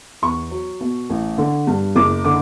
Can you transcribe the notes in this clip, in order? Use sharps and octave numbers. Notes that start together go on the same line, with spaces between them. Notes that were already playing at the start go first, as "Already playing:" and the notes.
E2 C#6
F#3
B2
A1
D3
G2
F#1 D6
D3 D6